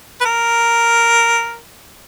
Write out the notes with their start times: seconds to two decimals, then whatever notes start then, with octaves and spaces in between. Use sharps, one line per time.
0.21 B4
0.25 A#4